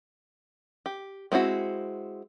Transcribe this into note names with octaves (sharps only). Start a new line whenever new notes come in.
G4
G#3 C4 E4 F#4